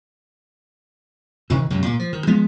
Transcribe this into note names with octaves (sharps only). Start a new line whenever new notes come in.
C3 D#3 E3
C#2 F#2 C3
A#2
F3
D#3
F3 G#3 B3